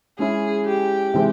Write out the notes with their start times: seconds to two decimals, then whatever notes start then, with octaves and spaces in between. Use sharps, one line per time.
0.19 G#3 C#4 E4 G#4
0.66 G4
1.14 C3 E3 G#3 C4